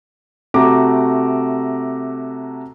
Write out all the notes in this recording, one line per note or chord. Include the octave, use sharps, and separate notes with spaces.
C3 A3 F#4 A#5 D6